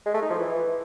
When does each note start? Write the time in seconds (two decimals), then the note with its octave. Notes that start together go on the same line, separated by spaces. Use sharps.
0.06 G#3
0.14 A3
0.22 D#4
0.30 F3
0.38 E3